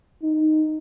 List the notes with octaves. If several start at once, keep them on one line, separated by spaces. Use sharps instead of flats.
D#4